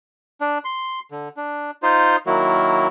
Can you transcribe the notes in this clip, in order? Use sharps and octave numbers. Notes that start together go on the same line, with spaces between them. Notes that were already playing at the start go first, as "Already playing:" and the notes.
D4
C6
D3
D4
D#4 F4 C5
D#3 F#3 A#3 E4 F#4